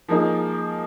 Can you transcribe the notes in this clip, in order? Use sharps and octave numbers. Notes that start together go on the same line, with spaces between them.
F3 A#3 D#4 G#4